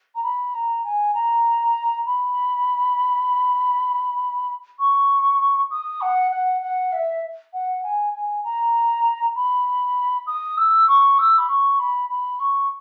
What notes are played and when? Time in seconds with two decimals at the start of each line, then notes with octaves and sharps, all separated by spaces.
0.15 A#5
0.23 B5
0.54 A#5
0.84 G#5
1.14 A#5
2.06 B5
4.79 C#6
5.71 D#6
6.01 F#5
6.31 F#5
6.62 F#5
6.92 E5
7.53 F#5
7.83 G#5
8.13 G#5
8.44 A#5
9.36 B5
10.27 D#6
10.58 E6
10.88 C#6
11.19 E6
11.38 B5
11.49 C#6
11.79 B5
12.09 B5
12.40 C#6